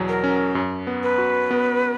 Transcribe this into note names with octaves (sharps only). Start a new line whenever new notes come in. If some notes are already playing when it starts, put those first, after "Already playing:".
Already playing: E2 B2 F#3
A#4
C#4
F#2
B3
B4
F#4
B3